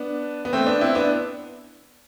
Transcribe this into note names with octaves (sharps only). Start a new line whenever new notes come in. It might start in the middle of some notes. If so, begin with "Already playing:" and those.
Already playing: B3 D4
B3
A3 C4
B3 D4
C4 E4
B3 D4